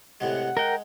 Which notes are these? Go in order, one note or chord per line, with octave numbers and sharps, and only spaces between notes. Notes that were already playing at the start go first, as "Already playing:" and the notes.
A2 C3 G#3 F#5
G#3 A#4 G5